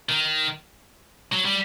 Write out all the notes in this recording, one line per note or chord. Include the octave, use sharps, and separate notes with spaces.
D#3
F#3
G3